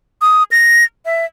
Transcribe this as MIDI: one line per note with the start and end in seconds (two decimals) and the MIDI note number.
0.22 0.43 87
0.51 0.84 94
1.05 1.25 76